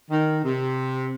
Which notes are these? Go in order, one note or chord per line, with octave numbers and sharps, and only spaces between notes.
D#3
C3